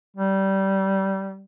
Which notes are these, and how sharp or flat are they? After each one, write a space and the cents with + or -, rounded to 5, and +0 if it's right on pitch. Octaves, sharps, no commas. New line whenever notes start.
G3 -20